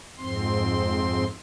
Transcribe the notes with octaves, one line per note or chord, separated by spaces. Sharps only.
F2 G#2 C4 C6